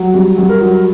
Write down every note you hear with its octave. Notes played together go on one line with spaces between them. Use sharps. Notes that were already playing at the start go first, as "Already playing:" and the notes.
Already playing: F#3
G2
G2
A#4
F#3